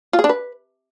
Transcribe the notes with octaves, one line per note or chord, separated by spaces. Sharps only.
F4
G#4
D4
B4